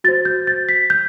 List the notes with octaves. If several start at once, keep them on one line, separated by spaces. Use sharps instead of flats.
F#4 C5 A6
G6
A6
B6
G6